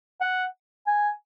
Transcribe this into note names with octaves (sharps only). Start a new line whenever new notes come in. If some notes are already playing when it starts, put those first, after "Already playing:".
F#5
G#5